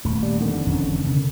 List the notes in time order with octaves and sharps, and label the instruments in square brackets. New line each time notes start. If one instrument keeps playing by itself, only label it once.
[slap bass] D#1 A3
[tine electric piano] G3
F2 D3 D#3
[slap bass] E1 C#4
C#3